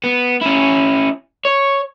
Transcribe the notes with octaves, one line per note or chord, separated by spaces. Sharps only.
B3
C#4 E4
C#5